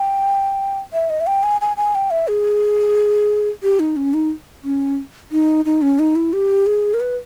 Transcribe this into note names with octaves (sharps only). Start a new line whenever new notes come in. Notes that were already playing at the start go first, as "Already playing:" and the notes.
Already playing: G5
E5
D#5
E5
G5
G#5
G#5
G#5
G5
E5
G#4
G4
D#4
C#4
D#4
C#4
D#4
D#4
C#4
D#4
E4
G4
G#4
A#4
B4